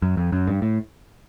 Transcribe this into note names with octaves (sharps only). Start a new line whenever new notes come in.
F#2
F2
F#2
G2
A2